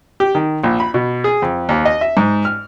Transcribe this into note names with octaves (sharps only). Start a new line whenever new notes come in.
G4
D#3
A#1
B5
B2
G#4
F2
D#2
D#5
E5
G#2
F6